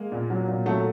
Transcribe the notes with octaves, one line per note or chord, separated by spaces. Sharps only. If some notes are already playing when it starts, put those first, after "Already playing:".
Already playing: G#3 A#3
A#2
F#3
A#2
F#3 A3